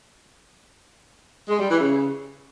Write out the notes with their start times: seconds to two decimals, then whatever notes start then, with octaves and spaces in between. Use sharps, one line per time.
1.47 G#3
1.58 G3
1.69 E3
1.80 C#3